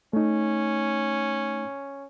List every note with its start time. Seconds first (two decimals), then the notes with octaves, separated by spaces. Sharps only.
0.13 A3 C#4 D#4